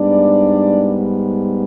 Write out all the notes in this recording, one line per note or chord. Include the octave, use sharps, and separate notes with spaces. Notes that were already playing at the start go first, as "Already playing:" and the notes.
Already playing: G#2 G3 B3 D4 D5